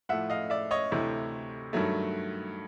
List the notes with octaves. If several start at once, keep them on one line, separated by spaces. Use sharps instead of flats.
A2 F3 A3 E5 F#5
D#5 F5
D5 E5
C#5 D#5
D2 C3 E3 A3
G2 D#3 F#3 A3